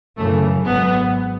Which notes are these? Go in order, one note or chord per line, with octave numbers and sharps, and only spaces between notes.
F#2 C#3 E3 A3
G#1 G#2 F#3 B3